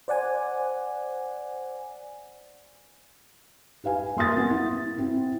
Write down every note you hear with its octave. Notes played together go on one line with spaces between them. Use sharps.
C5 D5 F#5 G#5
G4 B4 F5 G#5
A#3 C6 D#6 A6
B3
E4
C4 E4